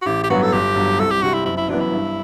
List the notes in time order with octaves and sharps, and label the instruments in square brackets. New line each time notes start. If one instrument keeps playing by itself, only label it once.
[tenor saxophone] F#4
[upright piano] A1 [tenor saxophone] G4
[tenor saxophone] G4
[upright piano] G2 F#3 B3 [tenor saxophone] F#4
[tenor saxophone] A4
[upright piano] G1 [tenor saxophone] G4
[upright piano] G2 F#3
[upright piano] C2 [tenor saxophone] A4
[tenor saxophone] G4
[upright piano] C3 G3 C4 [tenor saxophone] F#4
[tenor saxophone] E4
[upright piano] F#1 [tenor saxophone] E4
[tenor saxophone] E4
[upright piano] F#2 E3 B3 [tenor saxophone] D4
[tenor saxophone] E4
[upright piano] G2